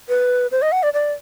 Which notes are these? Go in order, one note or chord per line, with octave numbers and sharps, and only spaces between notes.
B4
C5
D#5
F#5
D5
D5